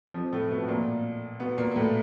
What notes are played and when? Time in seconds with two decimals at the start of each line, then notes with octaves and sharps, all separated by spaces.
0.14 F2 F3
0.33 A2 A3
0.50 B2 B3
0.68 A#2 A#3
1.40 B2 B3
1.58 A#2 A#3
1.71 A#3
1.76 A2 A3